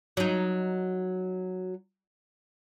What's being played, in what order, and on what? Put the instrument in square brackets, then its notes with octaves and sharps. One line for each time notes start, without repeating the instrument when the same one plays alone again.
[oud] F#3 D#4